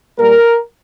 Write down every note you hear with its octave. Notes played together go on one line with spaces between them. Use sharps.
A#2 G3 A#3 A#4